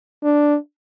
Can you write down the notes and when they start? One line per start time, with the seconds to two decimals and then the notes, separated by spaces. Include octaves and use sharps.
0.24 D4